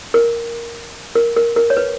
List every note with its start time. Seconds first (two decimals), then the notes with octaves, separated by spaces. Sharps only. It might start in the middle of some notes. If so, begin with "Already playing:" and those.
0.14 A#4
1.15 A#4
1.37 A#4
1.56 A#4
1.70 C#5
1.77 B4